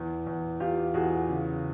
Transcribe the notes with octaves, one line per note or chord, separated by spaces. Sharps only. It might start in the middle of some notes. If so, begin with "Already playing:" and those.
Already playing: E2
E2
E2 F4 G4
E2 F#4 G#4
C#3